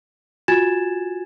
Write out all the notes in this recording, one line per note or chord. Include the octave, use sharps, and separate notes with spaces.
F4 F#4 G#5 G#6 A6 E7